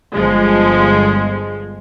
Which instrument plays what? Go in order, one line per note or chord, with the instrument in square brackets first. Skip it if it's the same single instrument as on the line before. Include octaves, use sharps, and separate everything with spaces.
[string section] G1 F3 G#3